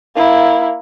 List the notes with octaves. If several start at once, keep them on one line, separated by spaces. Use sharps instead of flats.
A#3 E4